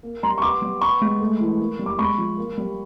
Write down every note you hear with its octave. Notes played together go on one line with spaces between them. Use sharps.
A#3
G3 A#5 C6
C#6
B3 C6 D6
G3
B3 B5 C#6
G#3
A3
E3
A#3
G3
D6
G#3 B5 C#6
F3
A#3
G3